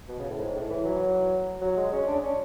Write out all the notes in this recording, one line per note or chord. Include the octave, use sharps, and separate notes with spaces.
B2
C#3
A2
G#2
A2
E3
F#3
F#3
G#3
C#4
D4
C#4